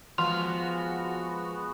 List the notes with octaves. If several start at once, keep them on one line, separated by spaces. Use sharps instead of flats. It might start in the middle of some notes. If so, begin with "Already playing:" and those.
F3 G#3 B3 F#4 C6 F6